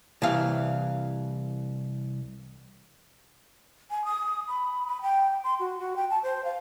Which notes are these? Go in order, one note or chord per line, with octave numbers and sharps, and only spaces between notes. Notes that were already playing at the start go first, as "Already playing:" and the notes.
C2 E3 F5
G#5
D#6
B5
B5
G5
C6
F#4
F#4
G5
A5
C5
F5